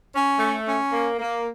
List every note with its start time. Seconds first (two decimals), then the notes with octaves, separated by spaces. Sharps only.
0.12 C#4
0.39 A3
0.66 C#4
0.92 A#3
1.19 A#3